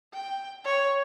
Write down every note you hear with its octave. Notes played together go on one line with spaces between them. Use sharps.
G5
C#5